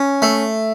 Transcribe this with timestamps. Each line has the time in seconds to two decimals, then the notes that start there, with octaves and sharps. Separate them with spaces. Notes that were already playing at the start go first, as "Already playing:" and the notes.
Already playing: C#4
0.22 A3